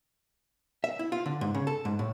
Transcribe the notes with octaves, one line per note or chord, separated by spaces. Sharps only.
E5
E4
F4
D3
G#2
C#3
A4
G#2
A2